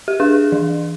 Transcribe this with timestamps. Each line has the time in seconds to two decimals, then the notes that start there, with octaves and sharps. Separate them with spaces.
0.08 G4
0.20 D4 G#4
0.52 E3